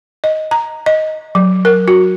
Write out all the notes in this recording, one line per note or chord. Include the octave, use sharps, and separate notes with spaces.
D#5
A#5
D#5
F#3
A#4
F#4